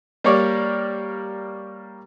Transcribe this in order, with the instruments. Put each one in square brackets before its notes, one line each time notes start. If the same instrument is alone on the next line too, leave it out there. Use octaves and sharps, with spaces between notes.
[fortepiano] G3 A#3 A#4 C#5 D5